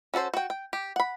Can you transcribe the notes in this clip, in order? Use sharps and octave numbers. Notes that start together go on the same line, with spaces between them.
C#4 F#4 A4 C5
F#4 G5
G5
G4
F#5 B5